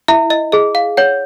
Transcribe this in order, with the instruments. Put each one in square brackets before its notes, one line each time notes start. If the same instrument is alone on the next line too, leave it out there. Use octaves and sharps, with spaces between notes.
[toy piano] E4 [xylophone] E5
[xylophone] D#5
[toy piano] G#4 [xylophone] D#5
[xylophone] F5
[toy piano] C#5 [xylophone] F#5